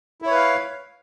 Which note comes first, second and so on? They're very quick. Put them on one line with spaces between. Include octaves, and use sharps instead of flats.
E4 C#5 B4 F5